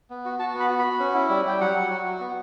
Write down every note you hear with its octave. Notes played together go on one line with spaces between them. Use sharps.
B3
F#4
F#4 A5
B3
B5
F#4
B5
F#4
C#4
E4
G3
G3 G5
F#3 F#5
F#3
F#4
F#4
B3